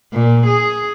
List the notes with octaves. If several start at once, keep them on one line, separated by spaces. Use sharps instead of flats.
A#2
G#4